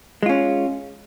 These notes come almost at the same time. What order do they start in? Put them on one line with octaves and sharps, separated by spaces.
G#3 F4 C#4